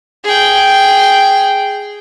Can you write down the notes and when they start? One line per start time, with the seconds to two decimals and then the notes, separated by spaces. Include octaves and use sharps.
0.24 G#4 G5